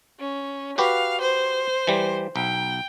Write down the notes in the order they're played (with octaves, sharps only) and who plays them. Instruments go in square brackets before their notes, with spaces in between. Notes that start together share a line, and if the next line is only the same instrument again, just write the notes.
[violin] C#4
[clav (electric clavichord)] F#4 G4 B4 [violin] F5
[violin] C5
[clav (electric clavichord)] E3 G3
[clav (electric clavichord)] B1 [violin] G5